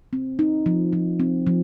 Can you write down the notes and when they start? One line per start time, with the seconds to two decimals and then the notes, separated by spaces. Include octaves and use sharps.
0.13 C4
0.39 D#4
0.66 F3
0.93 F3
1.20 C4
1.47 F3